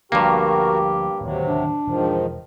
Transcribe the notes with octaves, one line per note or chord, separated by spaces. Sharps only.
D2 G2 F3 A#3 F#4 G4 A#4
D1 D#2 C3 F#3
D4
E1 G#2 D#3 F3